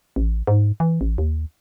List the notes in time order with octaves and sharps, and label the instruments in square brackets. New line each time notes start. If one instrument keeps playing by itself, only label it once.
[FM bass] A1
G#2
E3
A1
D#2